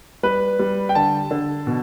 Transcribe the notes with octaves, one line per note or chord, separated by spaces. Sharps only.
G3 B4
G3
G5
D3 A5
D3
B2